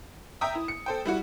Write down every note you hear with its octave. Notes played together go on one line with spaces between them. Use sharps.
E5 G5 A#5 D#6
E4
C#7
A4 C5 G5
G3 E4 F#4